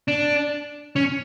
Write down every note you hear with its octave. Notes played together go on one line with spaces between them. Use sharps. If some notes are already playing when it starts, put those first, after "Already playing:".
D4
C#4